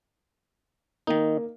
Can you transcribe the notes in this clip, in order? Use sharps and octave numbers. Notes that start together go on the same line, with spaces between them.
D#3 A#3 D#4